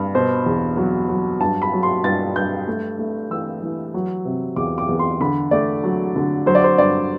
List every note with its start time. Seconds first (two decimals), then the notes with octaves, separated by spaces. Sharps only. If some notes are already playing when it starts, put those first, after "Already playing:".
Already playing: G2
0.15 B2 C5
0.46 E2
0.77 F#3
1.09 F#3
1.40 G2 A5
1.62 B5
1.73 F#3
1.83 C6
2.04 G2 A6
2.36 G2 G6
2.67 A3
2.99 A3
3.30 E3 E6
3.62 E3
3.94 F#3
4.25 C3
4.56 E2 D6
4.78 D6
4.89 E2
4.99 C6
5.20 D3 B5
5.51 A3 D5
5.84 F#3
6.16 D3
6.46 F#3 C5
6.55 D5
6.64 C5
6.78 G2 D5